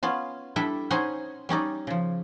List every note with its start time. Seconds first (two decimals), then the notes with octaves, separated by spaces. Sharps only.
0.03 B3 C#4 F4
0.56 G3 D4 E4 A4 E5
0.90 C#4 D#4 C5 F#5 G#5
1.49 G3 C#4 D#4 D5
1.87 C#3 F3